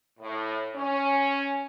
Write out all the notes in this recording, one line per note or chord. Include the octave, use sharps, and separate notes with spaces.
A2
C#4